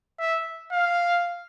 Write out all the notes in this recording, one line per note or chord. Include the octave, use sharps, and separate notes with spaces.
E5
F5